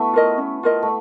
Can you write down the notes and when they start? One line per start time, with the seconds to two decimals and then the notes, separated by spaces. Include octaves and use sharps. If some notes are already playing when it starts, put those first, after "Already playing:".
Already playing: A3 B3 E4 F#4
0.13 F4 A#4 D#5
0.38 C#4
0.63 F4 A#4 D#5
0.83 A3